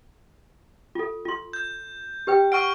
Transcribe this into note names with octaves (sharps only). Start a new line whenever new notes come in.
F4 A4
F4 C6
G6
G4 B4 G5
F#5 C#6 F6 D7